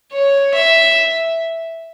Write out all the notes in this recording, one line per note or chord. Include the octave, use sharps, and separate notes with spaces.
C#5
E5